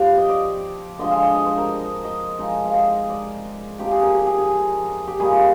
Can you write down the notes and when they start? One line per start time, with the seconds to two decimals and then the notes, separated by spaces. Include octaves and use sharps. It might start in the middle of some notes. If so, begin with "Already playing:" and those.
Already playing: F3 C4 G4 F5
0.17 D#5
0.29 D5
0.99 D3 F3 G#3 D#5
1.11 F5
1.23 D#5
1.34 D#5
1.46 C5
1.57 A#4
1.69 D#5
2.04 D#5
2.39 F3 G#3 D#4
2.65 F5
2.74 D#5
3.10 D5
3.79 F3 C4 D#4 G4
3.91 G#4
4.03 A#4
4.14 G4
4.27 G#4
4.38 G#4
5.07 G4
5.20 D#3 G3 A#3 G#4
5.31 F4